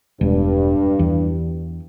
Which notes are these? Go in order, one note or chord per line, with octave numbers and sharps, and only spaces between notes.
E1 G2
E2